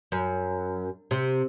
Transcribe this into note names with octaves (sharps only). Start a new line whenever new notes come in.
F#2
C3